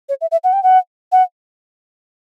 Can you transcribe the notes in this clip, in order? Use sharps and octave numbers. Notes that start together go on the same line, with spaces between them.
C#5
E5
E5
F#5
G5
F#5
F#5